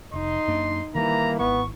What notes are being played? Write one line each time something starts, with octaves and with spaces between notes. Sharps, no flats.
F1 D#4 C6
F#2 A#3 D4
D#3 E3 G3 A#3 A#5
G#1 B3 C#6